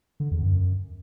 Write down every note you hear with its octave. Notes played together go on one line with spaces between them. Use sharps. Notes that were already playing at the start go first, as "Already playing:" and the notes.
D3
E2
F#2